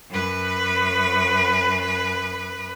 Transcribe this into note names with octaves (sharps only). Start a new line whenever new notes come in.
F#2 B4